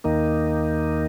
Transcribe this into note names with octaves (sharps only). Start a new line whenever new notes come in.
D#2 D#3 A#3 D#4